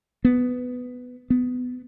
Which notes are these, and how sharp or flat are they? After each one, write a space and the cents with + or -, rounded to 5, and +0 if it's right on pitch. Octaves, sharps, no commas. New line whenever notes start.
B3 +10
B3 +20